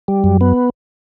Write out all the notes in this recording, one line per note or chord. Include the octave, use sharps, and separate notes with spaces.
G3
F#2
B3